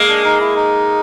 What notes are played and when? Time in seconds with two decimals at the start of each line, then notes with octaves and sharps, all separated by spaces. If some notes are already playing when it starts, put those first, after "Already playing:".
Already playing: G#3 A#3
0.08 D4
0.24 D#4
0.40 E4
0.56 D#4